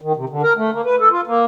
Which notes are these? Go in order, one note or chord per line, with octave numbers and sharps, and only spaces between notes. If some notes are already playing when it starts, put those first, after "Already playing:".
D#3
C3
D3
A#4
A3
A#3
B4
A4
F4
A#3